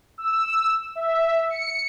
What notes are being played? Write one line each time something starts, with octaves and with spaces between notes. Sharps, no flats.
E6
E5
C#7